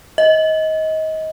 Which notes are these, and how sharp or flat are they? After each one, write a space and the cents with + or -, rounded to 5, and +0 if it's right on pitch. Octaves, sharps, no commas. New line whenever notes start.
D#5 +25